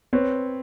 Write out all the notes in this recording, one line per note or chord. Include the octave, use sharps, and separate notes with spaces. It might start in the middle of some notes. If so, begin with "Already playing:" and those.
C4 B4 C#5